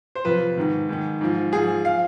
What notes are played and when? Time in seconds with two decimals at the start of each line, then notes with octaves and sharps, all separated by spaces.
0.15 C5
0.25 F2 C3 F3 B4
0.57 G#2 D#3
0.89 G#2 D#3
1.21 G#2 F3
1.52 G#2 F3 G#4
1.85 F3 F5